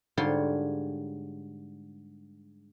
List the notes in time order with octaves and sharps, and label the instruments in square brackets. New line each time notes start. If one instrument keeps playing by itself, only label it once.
[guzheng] G#2 D3 G3 F4 C#5 C6